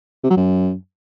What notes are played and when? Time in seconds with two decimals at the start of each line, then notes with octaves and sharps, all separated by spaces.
0.24 C3
0.30 F#3
0.37 F#2